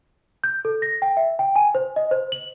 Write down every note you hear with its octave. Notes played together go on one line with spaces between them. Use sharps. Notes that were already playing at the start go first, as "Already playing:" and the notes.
G6
A4
A#6
G5
E5
G5
G#5
C5
D#5
C5
F#7